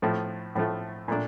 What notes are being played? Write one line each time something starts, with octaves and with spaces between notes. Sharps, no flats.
A2 F3 A3
A2 F3 A3
A#2 A3 D4